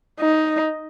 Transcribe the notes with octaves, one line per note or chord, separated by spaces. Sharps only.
D#4